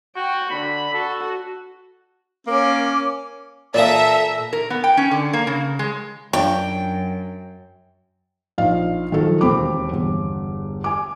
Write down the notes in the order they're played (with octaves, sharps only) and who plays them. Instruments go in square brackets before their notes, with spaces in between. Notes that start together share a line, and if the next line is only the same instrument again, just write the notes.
[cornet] F#4 [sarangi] G5
[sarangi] D3 [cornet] B5
[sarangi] F#4 [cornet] A4
[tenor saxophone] A#3 [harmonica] C#4 [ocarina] D6
[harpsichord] A#2 E3 D#6 [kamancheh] A4 A#5 [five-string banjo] D5 F5 [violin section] E5
[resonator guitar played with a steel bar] A#4
B3
G5
C#4
D3
A#3
C#3
G#3
[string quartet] F#2 [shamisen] D4 F4 C#5 [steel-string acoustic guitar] G5
[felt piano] A#1 D#4 F5
D#3 F3 F#3 F#4 A4
E1 D#2 C4 B5 D6
G1 E2
G#5 D6